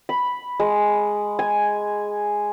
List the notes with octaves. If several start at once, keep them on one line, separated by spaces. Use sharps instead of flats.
B5
G#3
G#5